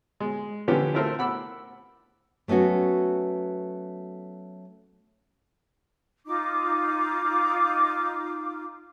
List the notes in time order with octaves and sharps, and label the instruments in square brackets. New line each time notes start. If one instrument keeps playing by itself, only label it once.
[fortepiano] G#3
D3 E3 F3 B3 C#4 G4
A3 C4 E4 A#4 C5 E5
F#5 B5 D6 E6
[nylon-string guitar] F#3 A3 B3 C#4 F#4
[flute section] D#4 F4 D6